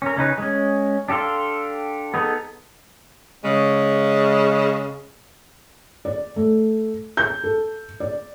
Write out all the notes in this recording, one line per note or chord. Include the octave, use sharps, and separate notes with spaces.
C#4 A#4
C#3 C#4 D#4 B4
G#3 C#4
D4 G4 A4 F5 C6
B3 D#4 G#4 A4
C#3 G#3
D5
A3
G6
A4
D5